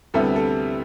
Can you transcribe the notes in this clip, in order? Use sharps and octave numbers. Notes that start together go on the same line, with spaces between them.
D2 C3 G3 B3 E4 A4
A4